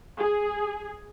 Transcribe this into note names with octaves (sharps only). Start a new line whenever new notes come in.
G#4